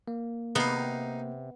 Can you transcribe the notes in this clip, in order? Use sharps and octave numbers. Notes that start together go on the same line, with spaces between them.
A#3
C3 B3 D#4 F5